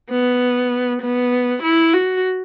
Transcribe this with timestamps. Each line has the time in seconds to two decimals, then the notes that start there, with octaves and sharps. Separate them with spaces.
0.10 B3
1.02 B3
1.63 E4
1.93 F#4